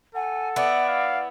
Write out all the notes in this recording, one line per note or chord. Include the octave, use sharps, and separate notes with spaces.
A4 F#5 G#5
B3 E4 D5
F5